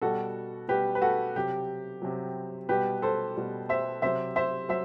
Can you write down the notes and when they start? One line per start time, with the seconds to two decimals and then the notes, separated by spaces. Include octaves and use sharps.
0.02 B2 G3 F#4 A4
0.68 B2 G3 G4 B4
0.95 B4
1.02 F#4 A4
1.36 C3 F#3 G4
2.02 C3 F#3
2.69 B2 G3 G4 B4
3.02 A4 C5
3.36 B2 G3
3.69 C5 E5
4.02 C3 F#3 C5 E5
4.36 C5 E5
4.69 F#3 C5 E5